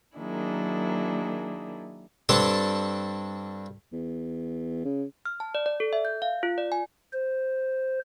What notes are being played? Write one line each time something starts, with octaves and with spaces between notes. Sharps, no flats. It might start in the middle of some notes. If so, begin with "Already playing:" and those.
D#3 F#3 A#3 D4 E4 G#4
G2 C4 D4 A4 A5
E2
C#3
F6
A5
D5
D5
A4
E5
G6
F5
F4
D5
G#5
C5